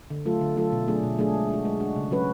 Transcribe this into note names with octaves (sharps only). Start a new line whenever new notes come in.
D3
F#3 A3 F4 A4
D3
F#3 A3 F4 A4
B2
F#3 A3 D4 G#4
B2
F#3 A3 D4 G#4
G#3
D4 F#4
G#3
D4 F#4
C#3
F#3 C#4 F#4 B4